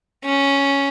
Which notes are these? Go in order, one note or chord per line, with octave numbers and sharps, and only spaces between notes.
C#4